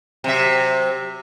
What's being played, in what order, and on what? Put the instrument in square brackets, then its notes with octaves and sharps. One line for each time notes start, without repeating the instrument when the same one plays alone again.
[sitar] C3 F#3 E5